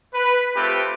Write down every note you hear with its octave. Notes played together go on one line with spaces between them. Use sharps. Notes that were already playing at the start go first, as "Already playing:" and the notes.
B4
A3 C4 F4 G4 B4